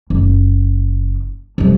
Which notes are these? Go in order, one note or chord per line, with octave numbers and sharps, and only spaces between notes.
F#1
C2 F2